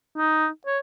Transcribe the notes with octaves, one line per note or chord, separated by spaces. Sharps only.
D#4
C#5